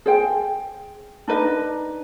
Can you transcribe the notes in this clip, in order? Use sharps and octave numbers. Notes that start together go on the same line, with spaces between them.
G#4 C5 G5
D4 D#4 B4 D#5